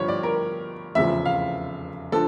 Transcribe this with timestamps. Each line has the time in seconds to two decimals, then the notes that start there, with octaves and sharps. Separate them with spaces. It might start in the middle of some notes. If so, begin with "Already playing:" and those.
Already playing: G1 G2 F3 C#5
0.08 D5
0.23 A#4
0.95 F1 E2 C#3 F3 E5
1.25 F5
2.12 D3 F3 A4